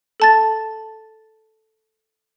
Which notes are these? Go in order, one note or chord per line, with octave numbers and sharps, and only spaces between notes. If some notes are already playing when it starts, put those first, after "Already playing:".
A4 A5 A6